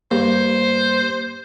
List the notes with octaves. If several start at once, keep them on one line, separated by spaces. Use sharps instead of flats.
G2 A#3 C5